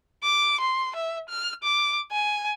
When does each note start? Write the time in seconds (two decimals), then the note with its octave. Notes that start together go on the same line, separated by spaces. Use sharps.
0.23 D6
0.60 C6
0.96 E5
1.29 F6
1.63 D6
2.12 G#5